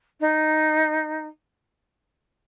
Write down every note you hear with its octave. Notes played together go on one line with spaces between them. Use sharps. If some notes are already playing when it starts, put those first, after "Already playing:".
D#4